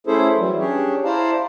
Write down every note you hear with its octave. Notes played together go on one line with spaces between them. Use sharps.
A3 C#4 E4 G#4 A4 C5
E3 F#3 G3
C#4 D4 G4 G#4 C#5
E4 C5 D5 F5 A5 A#5